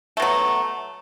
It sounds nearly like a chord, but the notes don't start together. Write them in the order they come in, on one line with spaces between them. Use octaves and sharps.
A3 B2 F#3